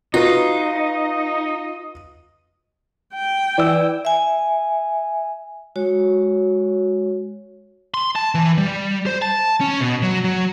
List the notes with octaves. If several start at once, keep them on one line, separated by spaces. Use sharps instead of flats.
D#4 F4 F#4 B4 D#5
G5
E3 D5 E6
E5 G#5
G#3 F#4 C#5
C6
A5
E3
G3
C5
A5
C#4
B2
F#3
F#3